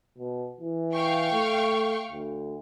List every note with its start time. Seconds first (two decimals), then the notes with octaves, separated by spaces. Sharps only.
0.18 B2
0.60 E3
0.93 F5 G5 C#6
1.32 A3
2.12 D2